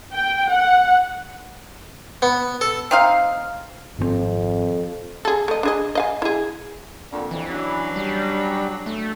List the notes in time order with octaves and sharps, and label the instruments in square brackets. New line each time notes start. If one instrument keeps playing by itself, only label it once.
[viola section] G5
F#5
[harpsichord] B3
A4
[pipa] C4 D#4 F5
[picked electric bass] G#1 B2 C4 [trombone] F2
[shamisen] G#4 A4
A3 D#5
D4 G#4 D#5
D#5 F5 G#5
E4 G#4
[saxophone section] F2 A#2 D3
[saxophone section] F2 [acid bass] E3
[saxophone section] F#3 C#4 D4
[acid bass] G3
A3